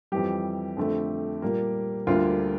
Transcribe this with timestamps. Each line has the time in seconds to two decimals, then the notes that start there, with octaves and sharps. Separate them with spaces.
0.12 F2 E3 G3 G4
0.77 F2 D3 A3
1.42 A#2 G3 A#3
2.07 D2 D3 G3 A#3 F4